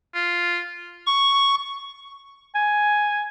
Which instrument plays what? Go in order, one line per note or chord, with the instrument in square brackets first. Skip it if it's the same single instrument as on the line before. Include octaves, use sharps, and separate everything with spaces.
[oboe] F4
[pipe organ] C#6
[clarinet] G#5